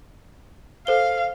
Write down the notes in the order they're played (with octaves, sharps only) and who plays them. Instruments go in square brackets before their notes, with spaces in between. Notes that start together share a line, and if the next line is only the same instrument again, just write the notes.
[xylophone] A4 C5 G7 [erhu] F5